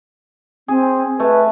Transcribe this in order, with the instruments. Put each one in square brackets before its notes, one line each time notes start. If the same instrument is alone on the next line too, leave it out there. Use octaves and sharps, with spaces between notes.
[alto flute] C4 [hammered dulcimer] G#4
[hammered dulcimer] A3 [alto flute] B4